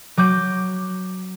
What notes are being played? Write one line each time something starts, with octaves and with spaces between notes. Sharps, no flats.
F#3 D6 G6